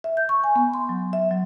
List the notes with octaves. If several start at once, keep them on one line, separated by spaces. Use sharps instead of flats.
E5
G6
C#6
G#5
B3
C6
F#3
E5
F#3